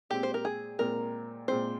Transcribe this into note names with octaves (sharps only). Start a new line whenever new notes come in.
A#2 G#3 C4 G4
C5
A#4
G#4
A#2 G#3 C4 A#4
A#2 G#3 C4 C5